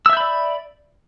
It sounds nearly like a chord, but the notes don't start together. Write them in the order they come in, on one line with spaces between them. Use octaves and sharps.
E6 E5 G6 B5 D5